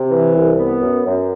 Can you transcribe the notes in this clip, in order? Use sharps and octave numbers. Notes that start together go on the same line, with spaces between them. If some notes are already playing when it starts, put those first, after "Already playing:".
Already playing: C3
E3
C2
B3
F#2
F#2